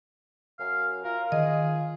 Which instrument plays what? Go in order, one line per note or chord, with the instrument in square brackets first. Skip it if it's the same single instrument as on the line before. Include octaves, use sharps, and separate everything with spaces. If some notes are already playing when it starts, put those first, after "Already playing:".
[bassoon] F#2 [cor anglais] F5
[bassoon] F4 [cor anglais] A#4
[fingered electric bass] D#3 [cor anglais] G#4 [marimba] D#5